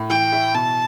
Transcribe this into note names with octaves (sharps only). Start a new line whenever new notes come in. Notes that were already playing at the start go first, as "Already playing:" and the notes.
Already playing: A2
E3 G5
E4
B2 A5